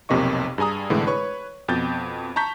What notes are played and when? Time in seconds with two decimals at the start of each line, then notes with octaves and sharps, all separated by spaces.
0.09 B1 F2 C3 A#3 D#5 C#6
0.58 G2 G#4 G#5 A#5 D#6
0.90 C2 A2 D3 E3 G#3
1.07 B4 C#5 C#6
1.68 F2 B2 G6 A6
2.36 A5 A#5 C#6 G6 B6